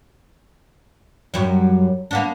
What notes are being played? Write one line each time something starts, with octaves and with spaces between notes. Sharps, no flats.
F#2 G3
A#3 B3 D4